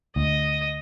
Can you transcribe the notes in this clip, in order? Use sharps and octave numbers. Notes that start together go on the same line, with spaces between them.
D2 D#5